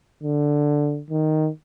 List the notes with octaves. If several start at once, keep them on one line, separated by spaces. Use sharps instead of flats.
D3
D#3